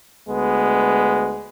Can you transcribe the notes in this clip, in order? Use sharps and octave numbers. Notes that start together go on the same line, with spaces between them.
D2 G#3 B3